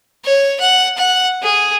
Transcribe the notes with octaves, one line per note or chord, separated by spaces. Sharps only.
C#5
F#5
F#5
G#4